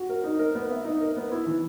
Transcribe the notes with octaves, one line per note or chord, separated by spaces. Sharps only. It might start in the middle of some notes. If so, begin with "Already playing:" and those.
Already playing: F#4
A#4
D#4
A#4
B3
E5
D#4
A#4
B3
E4
E3